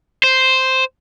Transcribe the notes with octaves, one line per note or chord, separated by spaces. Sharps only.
C5